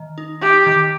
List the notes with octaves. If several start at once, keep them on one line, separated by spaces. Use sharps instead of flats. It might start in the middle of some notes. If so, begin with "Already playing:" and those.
Already playing: D#3
D#4
D#4 G4
D#3